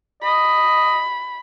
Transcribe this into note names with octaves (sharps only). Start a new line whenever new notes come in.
D#5 B5